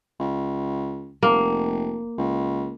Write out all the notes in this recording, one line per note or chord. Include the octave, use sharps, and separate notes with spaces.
C#2
F1 A#3
C#2